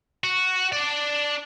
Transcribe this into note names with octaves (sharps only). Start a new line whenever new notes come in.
F#4
D4 D5